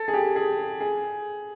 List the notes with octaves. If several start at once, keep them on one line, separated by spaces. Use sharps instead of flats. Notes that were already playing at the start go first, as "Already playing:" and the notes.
Already playing: A4
G#4
G4
G#4
G#4